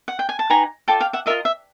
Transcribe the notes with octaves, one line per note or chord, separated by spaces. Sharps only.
F#5
G5
G#5
A5
D#4 G4 B4 G#5 A#5
F4 A4 D5 G5 A5
F5 G5
E5 F#5
F4 A#4 D#5 E5
E5